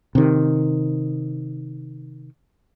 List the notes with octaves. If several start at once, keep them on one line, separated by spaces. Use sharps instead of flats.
C3 D#3